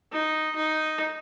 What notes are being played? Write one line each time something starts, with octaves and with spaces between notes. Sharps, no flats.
D#4
D#4